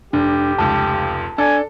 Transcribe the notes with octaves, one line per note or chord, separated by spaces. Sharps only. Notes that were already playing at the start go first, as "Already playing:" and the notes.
F1 D4 G4
F1 C#2 A5
D4 A4 G#5